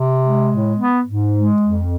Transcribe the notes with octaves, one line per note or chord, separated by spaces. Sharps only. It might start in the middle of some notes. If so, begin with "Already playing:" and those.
Already playing: C3
G#3
A2
B3
G#2
G#3
F2